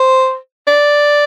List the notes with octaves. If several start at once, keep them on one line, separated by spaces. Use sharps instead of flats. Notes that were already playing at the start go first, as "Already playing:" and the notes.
Already playing: C5
D5